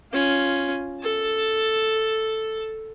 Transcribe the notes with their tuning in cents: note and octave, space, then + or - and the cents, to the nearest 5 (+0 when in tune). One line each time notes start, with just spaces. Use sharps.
C#4 +0 F4 +0
A4 +0 A5 +0